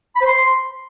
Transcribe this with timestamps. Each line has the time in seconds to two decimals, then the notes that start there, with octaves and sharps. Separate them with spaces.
0.16 B5
0.21 C5
0.26 C6